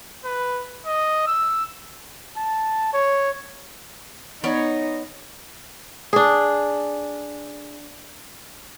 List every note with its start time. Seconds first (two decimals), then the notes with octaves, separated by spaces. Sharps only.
0.25 B4
0.87 D#5
1.27 E6
2.37 A5
2.93 C#5
4.44 B3 D#4 C#5 D5
6.13 D4 G#4